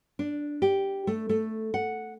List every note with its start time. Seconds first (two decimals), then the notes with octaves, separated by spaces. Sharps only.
0.19 D4
0.62 G4
1.07 A3
1.29 A3
1.74 F#5